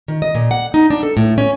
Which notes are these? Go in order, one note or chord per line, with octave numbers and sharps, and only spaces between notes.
D#3
D#5
A#2
F#5
D#4
D4
A4
A2
C#4